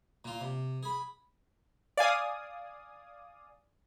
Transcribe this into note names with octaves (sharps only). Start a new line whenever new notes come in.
A#2 F4
C3
G#4 B5
D5 F5 G#5 D#6